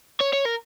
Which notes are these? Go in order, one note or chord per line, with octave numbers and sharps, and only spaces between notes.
C#5
C#5
A#4